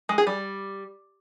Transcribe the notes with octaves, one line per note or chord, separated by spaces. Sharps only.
G#3
G#4
G3